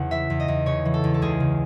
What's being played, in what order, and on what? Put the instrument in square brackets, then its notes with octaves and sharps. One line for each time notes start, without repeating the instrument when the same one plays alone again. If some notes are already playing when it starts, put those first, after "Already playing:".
Already playing: [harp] E2 C#3 F#5
E3 E5
E2
D#5
E2
C#3 C#5
E3
A4
E2
A4
C#2 G#4
C#3